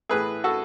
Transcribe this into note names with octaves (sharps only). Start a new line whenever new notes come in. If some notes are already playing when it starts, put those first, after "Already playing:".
A2 E3 A3 G#4 B4
F#4 A4